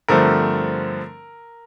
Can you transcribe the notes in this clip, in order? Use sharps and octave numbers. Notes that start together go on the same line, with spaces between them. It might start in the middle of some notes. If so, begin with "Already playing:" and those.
G2 D3 F3 A3 C4 A#4